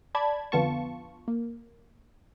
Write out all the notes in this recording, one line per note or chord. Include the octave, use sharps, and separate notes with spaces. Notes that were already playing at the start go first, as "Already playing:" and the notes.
D5 A5 B5 G#6
F2 D3 B3 F4 A5 C#6
A#3